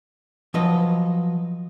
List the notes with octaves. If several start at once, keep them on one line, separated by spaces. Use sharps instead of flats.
F3 F#3 B4 D#5